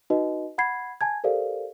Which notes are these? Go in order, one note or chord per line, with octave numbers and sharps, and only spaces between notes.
D#4 F#4 B4 D#5
F#5 B5 G#6 C7
G#5 A5 G#6
G4 A4 A#4 C5 D5 F5